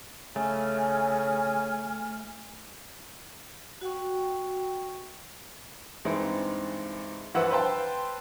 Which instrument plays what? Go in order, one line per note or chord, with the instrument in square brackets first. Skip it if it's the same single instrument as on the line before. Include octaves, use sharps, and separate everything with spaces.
[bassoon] C#3 [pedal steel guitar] A3 [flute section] G#5 F6
[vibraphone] F#4 F#5 G5 C#6
[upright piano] G2 E3 G#3 C4 D#4
G2 E3 F3 B4 F#5 E6
B4 C5 F5 G5 A5